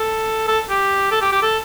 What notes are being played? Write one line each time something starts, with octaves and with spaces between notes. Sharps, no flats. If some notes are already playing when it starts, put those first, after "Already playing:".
Already playing: A4
A4
G4
A4
G4
G4
A4